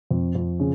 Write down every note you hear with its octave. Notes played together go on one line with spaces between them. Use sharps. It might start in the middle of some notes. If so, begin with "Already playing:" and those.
F2
F2
C#3